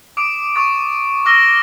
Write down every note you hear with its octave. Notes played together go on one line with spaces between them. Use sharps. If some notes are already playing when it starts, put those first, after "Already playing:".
D6 D#6 D7
C#6 D#6 A6
D6 E6 F6 A#6 G7